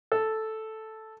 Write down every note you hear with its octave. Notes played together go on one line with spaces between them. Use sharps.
A4